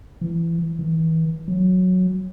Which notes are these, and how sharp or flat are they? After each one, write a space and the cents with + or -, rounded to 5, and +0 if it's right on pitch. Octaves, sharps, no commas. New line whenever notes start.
E3 +25
E3 -35
F#3 -10